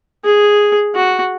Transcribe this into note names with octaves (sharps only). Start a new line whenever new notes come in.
G#4
F#4